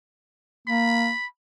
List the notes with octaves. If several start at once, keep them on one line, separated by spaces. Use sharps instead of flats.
A#3 B5